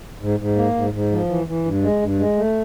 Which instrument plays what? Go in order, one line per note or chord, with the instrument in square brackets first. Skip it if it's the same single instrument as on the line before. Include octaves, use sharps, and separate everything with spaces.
[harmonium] G#2
G#2
A#3
G#2
G#2
F3
E3
E3
G2
G#3
G2
G#3
A3